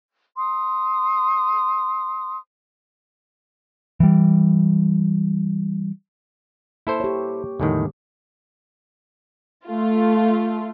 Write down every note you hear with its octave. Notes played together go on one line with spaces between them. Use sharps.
C6 D#6
E3 G3
A#3 E4 A4 C5
G4 C#5
E2 A2 D3 D#3 G3
A3 F4